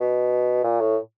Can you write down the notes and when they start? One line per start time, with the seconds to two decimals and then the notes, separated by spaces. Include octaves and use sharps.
0.01 B2
0.64 A#2
0.80 A2